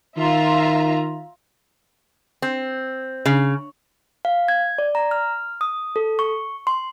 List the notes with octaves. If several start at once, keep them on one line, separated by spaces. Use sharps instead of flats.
D#3 F4 E5 A#5
C4
C#3
F5
G#6
D5
A#5
F6
D#6
A4
C#6
C6